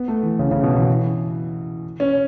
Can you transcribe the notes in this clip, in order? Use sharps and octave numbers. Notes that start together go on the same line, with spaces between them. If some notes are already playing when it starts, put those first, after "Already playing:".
Already playing: B3
A3
E3
C#3
C#3
B2
E3
C#4